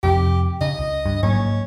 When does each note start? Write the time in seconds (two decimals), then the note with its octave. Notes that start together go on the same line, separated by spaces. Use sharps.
0.03 F2 C3 G4
0.61 C#3 D#5
0.78 C#2
1.06 G2
1.23 G#2 F#3 A#3 C#4